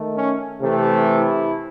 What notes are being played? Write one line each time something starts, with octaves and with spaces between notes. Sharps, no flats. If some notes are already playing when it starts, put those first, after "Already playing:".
Already playing: D#3 A3
C#4
C3 E3 A3
E4